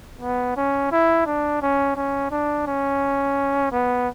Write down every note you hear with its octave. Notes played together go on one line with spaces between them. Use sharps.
B3
C#4
E4
D4
C#4
C#4
D4
C#4
B3